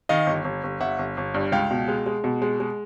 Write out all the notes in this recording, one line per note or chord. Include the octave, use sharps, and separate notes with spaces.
D#3 D#5 F5
G1
G1
G1
G1 E5 F#5
G1
G1
G2
C#2 F5 G5
B2
G#3
G#3
B2
G#3
G#3